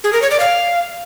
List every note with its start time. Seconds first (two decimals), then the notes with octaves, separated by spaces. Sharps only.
0.04 G#4
0.13 A#4
0.22 C#5
0.31 D5
0.40 F5